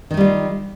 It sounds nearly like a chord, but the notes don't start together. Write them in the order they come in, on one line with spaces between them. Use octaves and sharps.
D#3 D#4 G3 F4